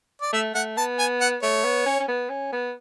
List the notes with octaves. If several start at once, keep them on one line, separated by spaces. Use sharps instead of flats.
D5
A3 E5
A3 F#5
B3 A5
G#5
F#5
A3 C#5
B3
C#4
C#4
B3
C#4
B3